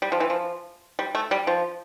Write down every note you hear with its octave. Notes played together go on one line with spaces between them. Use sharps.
G3
F3
E3
F3
G3
A3
G3
F3